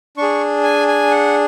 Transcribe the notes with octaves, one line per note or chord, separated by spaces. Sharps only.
D4 G#4 C#6
G#5
G#5
F#5